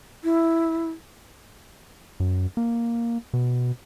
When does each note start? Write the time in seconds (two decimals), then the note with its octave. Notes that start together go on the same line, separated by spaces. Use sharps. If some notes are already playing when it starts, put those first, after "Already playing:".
0.24 E4
2.20 F#2
2.57 A#3
3.33 B2